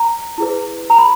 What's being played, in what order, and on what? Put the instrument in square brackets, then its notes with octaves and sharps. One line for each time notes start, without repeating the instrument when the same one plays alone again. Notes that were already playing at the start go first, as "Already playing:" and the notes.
Already playing: [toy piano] A#5
E4 G#4 B4
A#5
B5